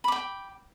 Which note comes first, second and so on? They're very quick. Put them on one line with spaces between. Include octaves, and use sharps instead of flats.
B5 D6 G5